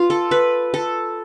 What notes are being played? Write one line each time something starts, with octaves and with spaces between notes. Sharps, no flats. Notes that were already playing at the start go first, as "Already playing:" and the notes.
Already playing: F4 B4
A4
B4
A4